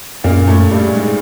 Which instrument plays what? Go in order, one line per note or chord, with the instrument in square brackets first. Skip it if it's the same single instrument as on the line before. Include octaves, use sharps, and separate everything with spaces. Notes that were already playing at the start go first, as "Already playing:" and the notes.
[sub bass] F#2 [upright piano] A#2 A#3
[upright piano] A2 A3
G2 G3
G#2 G#3